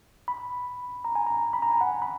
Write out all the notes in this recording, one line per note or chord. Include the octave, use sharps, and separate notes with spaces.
B5
A#5
G#5
A#5
B5
A#5
G#5
F#5
B5